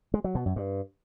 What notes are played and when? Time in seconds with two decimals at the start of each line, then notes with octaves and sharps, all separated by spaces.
0.14 G#3
0.24 F#3
0.35 B2
0.46 F#2
0.56 G2